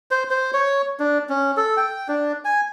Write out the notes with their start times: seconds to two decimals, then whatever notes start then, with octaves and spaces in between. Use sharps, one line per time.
0.11 C5
0.30 C5
0.54 C#5
1.00 D4
1.29 C#4
1.57 A4
1.77 G5
2.08 D4
2.45 G#5